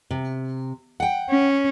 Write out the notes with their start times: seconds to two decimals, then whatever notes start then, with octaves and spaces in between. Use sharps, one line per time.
0.11 C3
1.00 F#5 G5
1.30 C#4